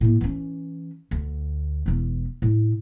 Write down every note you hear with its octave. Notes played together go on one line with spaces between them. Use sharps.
A2 A#3
E3 C#4
D2
E1 E3
A2